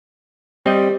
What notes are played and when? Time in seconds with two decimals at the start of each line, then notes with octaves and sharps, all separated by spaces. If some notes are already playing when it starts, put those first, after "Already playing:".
0.66 G3 C4 D#5